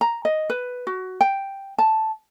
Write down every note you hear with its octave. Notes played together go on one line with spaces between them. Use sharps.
A#5
D#5
B4
F#4
G5
A5